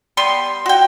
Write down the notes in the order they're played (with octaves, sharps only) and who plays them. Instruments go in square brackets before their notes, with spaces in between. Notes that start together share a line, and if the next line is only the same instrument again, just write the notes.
[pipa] G3 B3 C6
F#4 G5